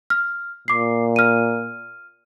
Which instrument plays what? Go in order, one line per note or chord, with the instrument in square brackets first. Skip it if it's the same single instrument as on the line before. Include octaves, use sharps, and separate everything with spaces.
[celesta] F6
[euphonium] A#2 [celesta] D6 C7
[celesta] F6 D#7